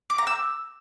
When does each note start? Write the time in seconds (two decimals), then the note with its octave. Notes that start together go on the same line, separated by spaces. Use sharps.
0.10 D6
0.18 A#5
0.27 E6